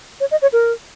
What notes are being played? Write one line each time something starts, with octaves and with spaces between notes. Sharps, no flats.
C#5
D#5
C#5
A#4